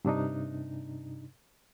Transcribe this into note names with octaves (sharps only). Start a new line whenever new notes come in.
G2 C3 D4 D#4